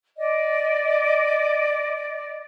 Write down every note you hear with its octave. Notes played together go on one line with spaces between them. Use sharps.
D5 D#5